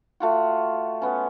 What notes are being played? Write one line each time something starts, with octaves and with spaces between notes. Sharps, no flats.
A3 F4 F#4
B3 C#4